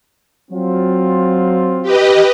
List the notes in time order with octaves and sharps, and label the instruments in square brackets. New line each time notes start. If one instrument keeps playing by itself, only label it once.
[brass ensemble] F#3 C4 F4
[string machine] G4 B4 D#5